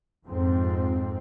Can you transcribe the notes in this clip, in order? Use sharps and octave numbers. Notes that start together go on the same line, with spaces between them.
F2 G#2 C4